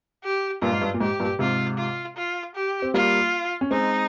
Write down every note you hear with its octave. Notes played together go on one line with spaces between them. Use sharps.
G4
G2 A#2 F4
G#2
G2
A#2
G#2 G4
G2 A#2
G#2 C3 F4
F4
F4
G4
C4
G3 A#3 F4
C#4
G#3 C4 D#4